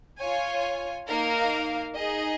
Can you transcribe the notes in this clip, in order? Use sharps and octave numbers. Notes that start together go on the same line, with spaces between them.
F4 C#5 G#5
A#3 D#4 A#4 F5
D#4 G#4 D#5